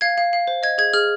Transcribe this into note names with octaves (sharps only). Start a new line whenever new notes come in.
F5 G#6
F5
F5
C5
D#5 G#6
G#4 G#6
G#4 F6